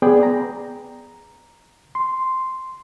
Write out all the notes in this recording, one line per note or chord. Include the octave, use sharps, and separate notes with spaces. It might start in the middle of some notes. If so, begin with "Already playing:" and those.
B3 G#4 D5 G5
A#5
C6